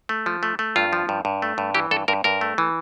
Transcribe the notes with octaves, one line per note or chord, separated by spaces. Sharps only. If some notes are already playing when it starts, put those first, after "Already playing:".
A3
F3
A3
A3
G2 F4
F3
G2
G2
A3
G2
E3 G4
G2 A4
G2 A#4
G2 A#4
A3
E3